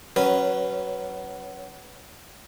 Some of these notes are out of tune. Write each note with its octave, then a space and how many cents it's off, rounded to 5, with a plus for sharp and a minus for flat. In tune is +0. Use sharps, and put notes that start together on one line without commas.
F#3 +20 C#4 +0 B4 +0